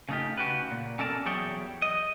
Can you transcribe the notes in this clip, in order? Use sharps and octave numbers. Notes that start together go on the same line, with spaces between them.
C#3 A3 D#4 F4 G4
C#3 F#4 G4 B4
A#2
B2 C#4 A4 A#4 D5 A5
E2 F#3 G3 G#4 C#5 G5
D#5